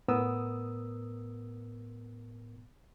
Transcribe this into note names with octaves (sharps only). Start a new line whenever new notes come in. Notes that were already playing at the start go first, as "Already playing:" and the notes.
A2 B3 A#4 D#6 E6